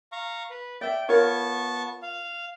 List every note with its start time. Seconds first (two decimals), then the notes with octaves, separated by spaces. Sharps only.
0.12 F5 A#5 C#6
0.50 B4
0.81 D5 E5 G5
1.09 B3 F4 A#4 C#5 A5 C#6
2.02 F5